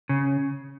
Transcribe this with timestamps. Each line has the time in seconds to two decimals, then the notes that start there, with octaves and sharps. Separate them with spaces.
0.09 C#3